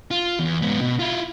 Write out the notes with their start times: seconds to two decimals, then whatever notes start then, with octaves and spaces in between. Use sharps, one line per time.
0.11 F4
0.39 E2
0.62 G#2 B3
0.81 B2
0.99 E4 F4